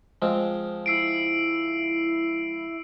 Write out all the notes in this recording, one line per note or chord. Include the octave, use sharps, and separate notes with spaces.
F3 G#3 C4
E4 E6 C7 D7